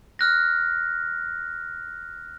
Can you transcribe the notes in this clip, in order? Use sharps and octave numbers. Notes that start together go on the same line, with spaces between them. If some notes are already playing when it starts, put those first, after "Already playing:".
F6 F#6 A#6